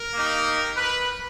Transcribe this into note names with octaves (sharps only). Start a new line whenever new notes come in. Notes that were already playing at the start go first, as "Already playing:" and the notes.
Already playing: A#4
A#3 D#4 G4
B4